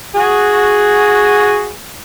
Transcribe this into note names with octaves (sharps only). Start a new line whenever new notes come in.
F#4 G#4